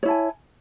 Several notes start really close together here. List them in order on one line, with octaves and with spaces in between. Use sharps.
C#5 E4 A5 G#5